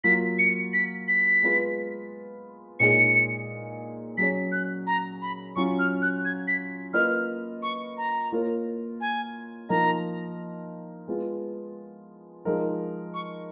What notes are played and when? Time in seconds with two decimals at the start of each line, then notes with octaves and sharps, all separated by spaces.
0.04 F#3 A#3 F4 B6
0.39 C#7
0.73 B6
1.08 B6
1.43 G#3 B3 F4 B4
2.80 A#2 G#3 D#4 G#4 C#5 C#7
4.18 F#3 C#4 G#4 C#5 B6
4.52 F#6
4.87 A#5
5.22 B5
5.56 F#3 C#4 F4 C#6
5.79 F6
6.02 F#6
6.25 G#6
6.48 B6
6.93 A#3 F4 B4 D#5 F6
7.63 C#6
7.97 A#5
8.32 A#3 F4 A#4 C#5
9.01 G#5
9.69 F3 A#3 D#4 A#4 A#5
11.08 G#3 B3 F4
12.45 F3 G#3 D#4 A#4
13.14 C#6